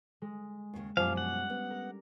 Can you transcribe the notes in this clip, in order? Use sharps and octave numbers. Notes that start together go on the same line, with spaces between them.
G#3
D#2 A2 C#3
F#2 B2 F3 G3 C#4 D4 F5 G#5
F#5
B3
A#4